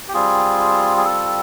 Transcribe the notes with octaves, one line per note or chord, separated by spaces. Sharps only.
G4
G3 C4 F4 G#4
G#4
A4